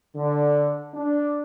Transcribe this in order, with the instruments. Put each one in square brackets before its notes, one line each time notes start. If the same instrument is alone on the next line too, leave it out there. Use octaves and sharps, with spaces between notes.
[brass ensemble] D3
D4